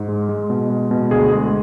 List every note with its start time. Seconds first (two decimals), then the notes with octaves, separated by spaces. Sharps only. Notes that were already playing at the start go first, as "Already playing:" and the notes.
Already playing: G#2
0.08 G#3
0.29 G#3
0.50 B2
0.70 G#3
0.91 B2
1.11 D2 G#4
1.33 G#3